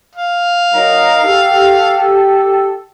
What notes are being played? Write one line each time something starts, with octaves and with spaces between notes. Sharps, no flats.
F5
F#3 D#4 A#4
G4 A4